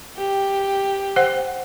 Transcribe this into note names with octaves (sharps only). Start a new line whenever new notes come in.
G4
C5 F#5